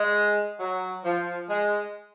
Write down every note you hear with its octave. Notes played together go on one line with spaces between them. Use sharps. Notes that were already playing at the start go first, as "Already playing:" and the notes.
Already playing: G#3
F#3
F3
G#3